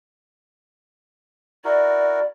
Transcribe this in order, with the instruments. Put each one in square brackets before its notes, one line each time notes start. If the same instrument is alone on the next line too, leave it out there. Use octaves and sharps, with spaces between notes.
[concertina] E4 F#4 A#4 [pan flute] D5